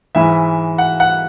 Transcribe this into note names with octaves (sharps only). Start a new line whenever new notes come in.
G#2 E3 G#3 E5
F#5
F#5